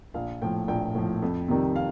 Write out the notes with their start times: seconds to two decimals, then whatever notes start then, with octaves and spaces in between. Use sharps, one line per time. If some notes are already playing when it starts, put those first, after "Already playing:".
0.14 A#1 F5
0.42 A2 F3 G5
0.68 A#1 G5
0.95 A2 F3
1.22 F2
1.49 C3 D#3 G3
1.76 F5